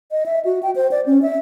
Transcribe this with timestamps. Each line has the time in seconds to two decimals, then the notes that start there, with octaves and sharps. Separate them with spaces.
0.11 D#5
0.26 E5
0.45 F#4
0.63 G5
0.76 C5
0.91 D5
1.06 C#4
1.22 E5